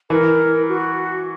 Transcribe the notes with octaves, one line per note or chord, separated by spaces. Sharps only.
E3 A#4
F#4